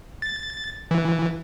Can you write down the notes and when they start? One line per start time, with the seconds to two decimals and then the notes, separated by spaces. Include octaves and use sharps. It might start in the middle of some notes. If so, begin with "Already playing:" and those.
0.22 A6
0.91 E3